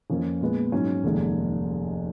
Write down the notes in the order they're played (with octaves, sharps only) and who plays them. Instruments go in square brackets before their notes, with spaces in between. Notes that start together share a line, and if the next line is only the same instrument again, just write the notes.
[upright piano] F2 F3 A#3 C#4
A#2 G#3 B3
G#2 F#3 C#4
F1 D#2 D#3 G#3 D#4